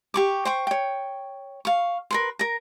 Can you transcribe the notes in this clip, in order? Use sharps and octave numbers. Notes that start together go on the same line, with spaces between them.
G4 C#6 D6
C5 G5 C#6
C#5 G5
F5 C#6
A#4 B4 C6
A#4 A#5